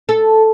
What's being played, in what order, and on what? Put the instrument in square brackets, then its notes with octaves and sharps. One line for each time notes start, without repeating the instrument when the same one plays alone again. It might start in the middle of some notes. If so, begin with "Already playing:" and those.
[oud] A4